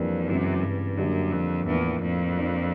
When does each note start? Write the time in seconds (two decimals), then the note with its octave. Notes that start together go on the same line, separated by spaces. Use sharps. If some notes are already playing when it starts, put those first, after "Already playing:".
Already playing: F2 E3 G3 A#3 D4
0.28 F#2 C#3 E3 G#3 C4
0.63 G2
0.97 F#2 D3 G3 A#3 D4
1.32 F2
1.67 E2 A2 F3 A#3 D4 F4
2.02 F2
2.36 F3 A#3 D4